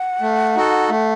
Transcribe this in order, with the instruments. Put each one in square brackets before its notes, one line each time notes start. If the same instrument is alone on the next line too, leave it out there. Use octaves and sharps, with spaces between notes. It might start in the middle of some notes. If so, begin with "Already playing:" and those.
Already playing: [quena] F#5
[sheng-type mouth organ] A3
D#4 F#4 A4
A3